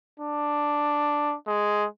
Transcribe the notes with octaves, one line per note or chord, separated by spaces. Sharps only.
D4
G#3